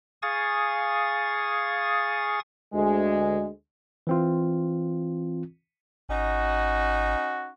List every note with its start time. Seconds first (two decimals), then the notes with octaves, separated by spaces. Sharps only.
0.22 G#4 F5 G#5 C#6 D#6 A6
2.73 D2 G#3
4.07 E3 C4 F4
6.09 G#1 C#4 D#4 F#4